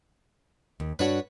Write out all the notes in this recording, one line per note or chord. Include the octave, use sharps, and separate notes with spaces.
D#2
G2 D4 F#4 B4 C#5 F#5